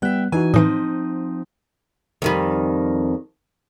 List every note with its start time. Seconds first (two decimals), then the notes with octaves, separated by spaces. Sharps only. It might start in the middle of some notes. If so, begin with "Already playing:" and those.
0.02 G3 B3 E5 G5 F#6
0.32 E3 D#4 F#4 G#5
0.54 A2 E3 F3 C4 D#4 D#6
2.22 F2 D#3 G3